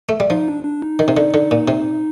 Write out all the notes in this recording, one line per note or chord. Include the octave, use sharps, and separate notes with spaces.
A3
G3
F3 D#4
D4
D4
D#4
D#3
C3
D3
D3
A#2
C3